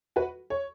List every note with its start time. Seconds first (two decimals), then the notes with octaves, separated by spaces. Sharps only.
0.16 F#4 B4
0.50 C#5